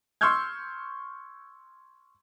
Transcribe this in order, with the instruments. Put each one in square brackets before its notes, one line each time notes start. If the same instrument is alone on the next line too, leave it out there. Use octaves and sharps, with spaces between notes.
[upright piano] C6 C#6 E6 F6 G6 G#6